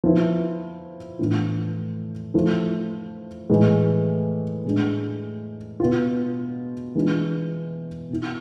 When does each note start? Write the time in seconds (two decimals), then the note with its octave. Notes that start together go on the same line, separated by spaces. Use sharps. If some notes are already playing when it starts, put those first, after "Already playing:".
0.04 F3 B3 E4
1.19 A2 E3 B3 D4 F4
2.34 F3 A3 E4
3.50 A2 E3 G#3
4.64 A2 G#3 D4
5.80 B2 B3 F4
6.95 E3 G#3 D4 F4
8.10 B2 B3 E4